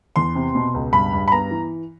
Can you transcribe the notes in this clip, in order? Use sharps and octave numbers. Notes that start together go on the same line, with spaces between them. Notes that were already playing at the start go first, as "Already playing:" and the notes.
E2 C6
C3
B2
C#2
G2 B5
G2
B5
B3 A#5
E3